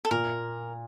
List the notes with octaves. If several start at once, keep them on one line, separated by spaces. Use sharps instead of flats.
A4
A#2 A#4